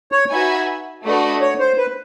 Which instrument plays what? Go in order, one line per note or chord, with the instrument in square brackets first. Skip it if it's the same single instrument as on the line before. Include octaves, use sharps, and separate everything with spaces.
[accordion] C#5
[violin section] D#4 F#4 B4 E5 G#5
A3 D4 F#4 B4 D#5
[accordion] C#5
C5
B4